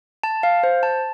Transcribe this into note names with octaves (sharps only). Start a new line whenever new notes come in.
A5
F5
C5
A5